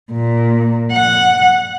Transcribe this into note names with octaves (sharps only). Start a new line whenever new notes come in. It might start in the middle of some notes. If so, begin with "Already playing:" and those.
A#2
F#5